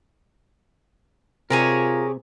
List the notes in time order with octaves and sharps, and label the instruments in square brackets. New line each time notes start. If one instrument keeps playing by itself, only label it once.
[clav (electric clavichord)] C3 [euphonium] F4 [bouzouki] G4 G#4 C#5 [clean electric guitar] A#4 G#5